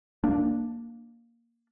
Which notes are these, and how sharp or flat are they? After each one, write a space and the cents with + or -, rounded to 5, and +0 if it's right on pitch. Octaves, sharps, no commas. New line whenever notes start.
A#3 +0 D4 +0